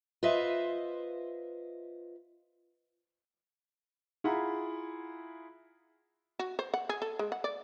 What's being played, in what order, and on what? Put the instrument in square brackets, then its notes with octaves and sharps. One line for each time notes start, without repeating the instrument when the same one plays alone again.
[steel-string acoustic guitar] F4 B4 C5 D#5 E5
[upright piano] E4 F4 G#4 F#5 A#5 B5
[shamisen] F#4
C5
F#5
G#4
A4
G#3
F#5
D5